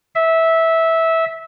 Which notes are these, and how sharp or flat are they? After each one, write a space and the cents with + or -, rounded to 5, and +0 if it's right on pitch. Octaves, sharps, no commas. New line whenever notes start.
E5 -15